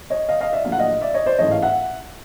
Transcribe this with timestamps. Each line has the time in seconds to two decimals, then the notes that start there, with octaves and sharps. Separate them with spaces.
0.10 C#5 D#5
0.29 D#5 F5
0.41 D#5 F5
0.52 D5 E5
0.65 A#1 A#2 F#3 A3 F5
0.72 F#5
0.79 D#5 F5
1.01 D5 E5
1.14 C#5 D#5
1.26 C5 D5
1.38 A1 G#2 E3 A3 C#5 D#5
1.51 F5
1.62 E5 F#5